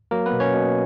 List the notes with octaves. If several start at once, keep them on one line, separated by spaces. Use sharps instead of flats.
F#3 A#3 A#4
B3 B4
B2
C#4 C#5
B2